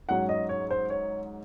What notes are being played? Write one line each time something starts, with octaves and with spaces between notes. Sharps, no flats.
G#2 F#3 C#4 F#5
D#5
C#5
C5
C#5